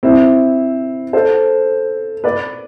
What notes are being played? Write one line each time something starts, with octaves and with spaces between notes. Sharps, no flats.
C4 E4
A4 C5
B4 D5